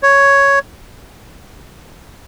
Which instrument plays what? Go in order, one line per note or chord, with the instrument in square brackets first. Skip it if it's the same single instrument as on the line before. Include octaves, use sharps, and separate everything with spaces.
[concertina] C#5